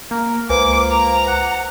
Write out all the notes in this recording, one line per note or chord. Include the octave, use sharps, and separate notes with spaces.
A#3 A#4
C#2 A#3 B4 C5 G#5 D6
A#5
F#5